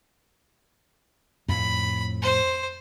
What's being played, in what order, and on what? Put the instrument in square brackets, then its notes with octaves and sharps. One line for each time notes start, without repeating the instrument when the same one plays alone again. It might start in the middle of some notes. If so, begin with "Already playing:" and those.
[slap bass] F2 A2 [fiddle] B5
[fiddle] C5